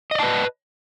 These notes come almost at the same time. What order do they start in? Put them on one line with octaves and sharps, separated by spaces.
D#5 D5 A5 B4